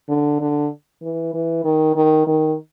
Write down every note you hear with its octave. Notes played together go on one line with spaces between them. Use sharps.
D3
D3
E3
E3
D#3
D#3
D#3